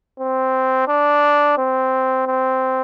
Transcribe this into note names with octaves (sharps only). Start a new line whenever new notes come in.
C4
D4
C4
C4